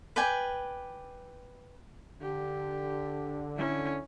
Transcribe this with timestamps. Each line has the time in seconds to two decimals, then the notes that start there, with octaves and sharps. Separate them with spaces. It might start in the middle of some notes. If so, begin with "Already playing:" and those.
0.16 B4 D5 G5 G#5
2.21 D3 G4
3.56 C#4 E4